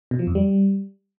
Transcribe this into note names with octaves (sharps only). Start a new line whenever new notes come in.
B2
F3
F2
G3